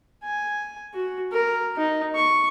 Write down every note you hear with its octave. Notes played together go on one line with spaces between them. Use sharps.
G#5
F#4
A#4
D#4
C#6